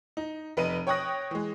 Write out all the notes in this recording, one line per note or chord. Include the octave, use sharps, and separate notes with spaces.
D#4
F1 B4 D#5 D#7
C#5 G5 C#6 D#6 F#6 A#6
E3 G#3